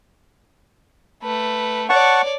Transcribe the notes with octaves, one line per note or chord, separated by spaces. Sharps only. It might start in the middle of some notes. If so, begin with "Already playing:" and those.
A3 B4
C#5 D5 F#5 A5 C#6